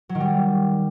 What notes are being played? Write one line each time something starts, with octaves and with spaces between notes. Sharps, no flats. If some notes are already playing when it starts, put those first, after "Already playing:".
F#3
D#3
G3